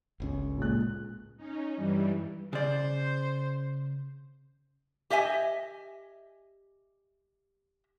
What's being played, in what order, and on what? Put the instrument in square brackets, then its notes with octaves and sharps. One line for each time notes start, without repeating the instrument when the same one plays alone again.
[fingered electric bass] G1 C#2 C#4
[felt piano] A#2 G#3 F#6
[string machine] C#4 D#4
G2 E3 G3
[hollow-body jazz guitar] C#3 D5 [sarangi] C5
[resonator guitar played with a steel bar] G4 D#5 E5 G#5